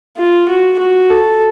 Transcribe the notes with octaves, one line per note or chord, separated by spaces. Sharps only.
F4
F#4
F#4
A4